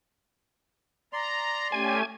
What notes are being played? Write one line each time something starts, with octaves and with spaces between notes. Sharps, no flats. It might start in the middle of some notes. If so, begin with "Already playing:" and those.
D5 A#5 C6
A3 C#4 G4 G#5